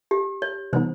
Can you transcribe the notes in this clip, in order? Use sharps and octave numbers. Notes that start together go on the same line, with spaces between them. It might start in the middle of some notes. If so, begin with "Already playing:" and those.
G4
C#5
C3 E3 G3 B3 D#4 C5